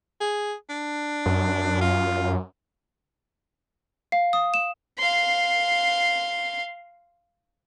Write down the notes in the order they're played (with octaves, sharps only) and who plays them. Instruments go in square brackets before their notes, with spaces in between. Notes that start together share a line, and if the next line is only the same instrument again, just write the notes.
[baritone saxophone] G#4
D4
[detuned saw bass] F#2
[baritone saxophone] F4
[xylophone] F5
D#6
E7
[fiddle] F5 C6